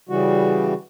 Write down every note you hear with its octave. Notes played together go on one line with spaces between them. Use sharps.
C#3 E3 G3 F#4